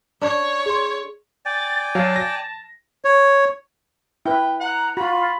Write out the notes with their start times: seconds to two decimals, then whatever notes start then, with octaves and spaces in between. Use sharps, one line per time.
0.21 D4 C#5
0.66 G#4 C6
1.45 D5 G5 G#5 A6
1.95 F#3 F5 A5
2.16 A#6
3.05 C#5
4.26 E4 B4 G5
4.60 F#5 A#5
4.97 F4 F#4 B5